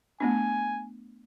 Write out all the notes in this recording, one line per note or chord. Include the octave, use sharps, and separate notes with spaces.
A3 B3 D4 G#5